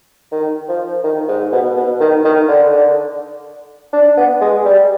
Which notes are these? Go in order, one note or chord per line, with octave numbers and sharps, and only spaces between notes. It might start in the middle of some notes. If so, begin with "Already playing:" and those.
D#3
F3
D#3
G#2
B2
B2
D#3
D#3
D3
D3
D4
B3
G#3
G3